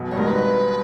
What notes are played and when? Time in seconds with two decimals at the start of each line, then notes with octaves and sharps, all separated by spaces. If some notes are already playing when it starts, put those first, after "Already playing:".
Already playing: B1 B2
0.11 G2 C#5
0.18 G#1 G#2 A#4
0.27 B4